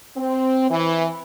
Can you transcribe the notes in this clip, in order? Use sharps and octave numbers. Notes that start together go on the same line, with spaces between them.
C4
E3